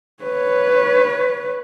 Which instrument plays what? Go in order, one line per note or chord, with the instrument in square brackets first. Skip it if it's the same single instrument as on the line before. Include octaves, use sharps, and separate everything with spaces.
[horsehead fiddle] B4 C#5